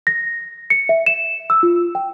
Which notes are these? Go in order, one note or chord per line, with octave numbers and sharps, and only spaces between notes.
A#6
C#7
E5
E7
E6
F4
G5